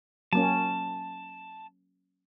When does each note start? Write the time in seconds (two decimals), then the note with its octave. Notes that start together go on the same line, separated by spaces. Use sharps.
0.33 F#3 A#3 C#4 A5